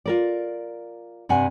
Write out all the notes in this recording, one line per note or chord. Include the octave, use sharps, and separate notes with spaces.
F4 A#4 D5
G2 C3 F#5 G#5